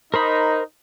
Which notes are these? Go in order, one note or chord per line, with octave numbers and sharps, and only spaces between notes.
D#4 A#4 C5 B5